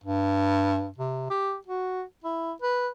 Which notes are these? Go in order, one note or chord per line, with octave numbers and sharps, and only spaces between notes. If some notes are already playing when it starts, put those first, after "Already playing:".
G2
C3
G4
F#4
E4
B4